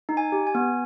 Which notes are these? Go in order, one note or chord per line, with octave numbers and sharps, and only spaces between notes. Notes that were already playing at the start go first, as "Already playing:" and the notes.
D#4
G#5
G4
G#5
B3